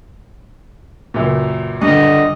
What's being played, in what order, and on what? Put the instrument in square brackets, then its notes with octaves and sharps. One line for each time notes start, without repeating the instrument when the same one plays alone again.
[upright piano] C#2 F#2 A#2
[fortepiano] G2 [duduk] D3 [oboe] D#5